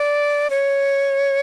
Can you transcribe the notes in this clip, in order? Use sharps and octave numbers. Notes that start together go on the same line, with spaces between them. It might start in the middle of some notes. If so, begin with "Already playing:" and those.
Already playing: D5
C#5